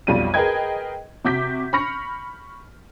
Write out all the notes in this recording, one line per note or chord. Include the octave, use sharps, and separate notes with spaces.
B1 F2 G3 F4 D#7
G#4 A#4 B4 D#5 G5 G#6
C3 F#4 D6 G6 B6
B5 C#6 F6 A#6 C#7